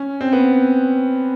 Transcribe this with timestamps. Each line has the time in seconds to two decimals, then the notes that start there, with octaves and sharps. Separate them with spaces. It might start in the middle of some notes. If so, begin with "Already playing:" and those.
Already playing: C#4
0.21 C4
0.33 B3